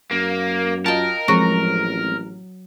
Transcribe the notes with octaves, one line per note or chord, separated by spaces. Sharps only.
F#2 A#3
F4 A#4 D#5 G5 A5
A1 F3 F#3 G#3 C4 F#4